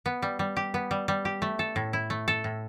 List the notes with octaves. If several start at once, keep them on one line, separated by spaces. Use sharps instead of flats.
B3
G3
G3
G4
B3
G3
G3
G4
A3
A4
A2
E4
A3
A4
A2